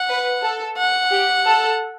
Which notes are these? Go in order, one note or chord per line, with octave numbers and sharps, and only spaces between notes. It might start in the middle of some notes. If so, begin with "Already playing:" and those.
Already playing: F#5
B4
A4
F#5
G4
A4